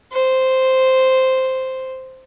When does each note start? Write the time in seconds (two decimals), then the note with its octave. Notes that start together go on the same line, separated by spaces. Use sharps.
0.12 C5